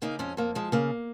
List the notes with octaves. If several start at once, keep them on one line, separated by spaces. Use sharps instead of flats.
C#3 A#3 D#4
F2 G#3 C#4
F2 A#3
F3 G#3
C#3 A#3